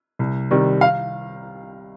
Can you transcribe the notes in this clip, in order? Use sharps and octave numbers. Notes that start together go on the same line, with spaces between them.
C2
C3 D#3 G3
F5